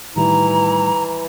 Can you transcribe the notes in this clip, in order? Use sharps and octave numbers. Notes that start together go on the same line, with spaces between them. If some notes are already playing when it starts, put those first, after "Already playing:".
A2 D#3 E3 G3 E4 A#5